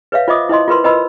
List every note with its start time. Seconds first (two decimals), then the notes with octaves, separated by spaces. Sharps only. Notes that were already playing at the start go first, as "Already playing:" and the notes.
0.12 B4 C#5 E5 F5
0.28 F4 C5 D#5 E5 D6 D#6
0.49 E4 C5 D#5 C6
0.68 F4 A#4 B4 C6
0.84 B4 C5 D#5 A#5 B5 E6